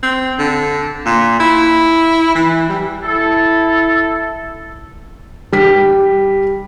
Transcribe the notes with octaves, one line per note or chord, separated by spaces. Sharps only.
C4
D3
A#2
E4
E3
G3
E4 A4
G3 B6